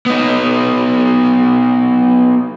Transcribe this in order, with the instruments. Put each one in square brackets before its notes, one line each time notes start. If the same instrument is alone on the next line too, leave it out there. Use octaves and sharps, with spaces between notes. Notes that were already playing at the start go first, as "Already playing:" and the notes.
[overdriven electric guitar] B3 D#4